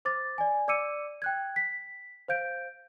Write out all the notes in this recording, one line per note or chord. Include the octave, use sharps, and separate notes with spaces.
C5 D6 A6
D5 G#5
D5 D6 E6 C#7 D#7
G5 F#6 G#6
B6
C5 F5 G6 D7